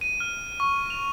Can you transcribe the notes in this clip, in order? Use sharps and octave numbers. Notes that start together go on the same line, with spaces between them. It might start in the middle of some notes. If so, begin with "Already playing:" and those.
D#7
F6
C#6
F7